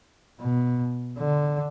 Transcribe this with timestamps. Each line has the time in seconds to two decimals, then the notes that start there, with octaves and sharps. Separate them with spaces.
0.41 B2
1.18 D3